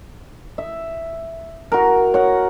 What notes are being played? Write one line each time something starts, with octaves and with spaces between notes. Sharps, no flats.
E5
F#4 A#4
C#5 F#5